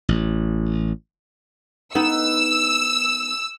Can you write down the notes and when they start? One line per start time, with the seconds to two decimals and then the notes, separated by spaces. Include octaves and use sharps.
0.09 A1
1.95 B3 D#4 E6